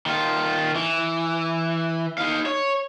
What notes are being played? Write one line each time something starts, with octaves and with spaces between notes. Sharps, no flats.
D#3 F4
E3
D#4 F5
C#5